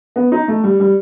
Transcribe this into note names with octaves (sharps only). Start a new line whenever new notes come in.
B3
D#4
A3
G3
G3